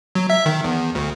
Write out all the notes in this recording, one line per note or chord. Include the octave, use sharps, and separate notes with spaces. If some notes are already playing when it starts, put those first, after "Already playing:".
F#3
E5
D#3
E2
D2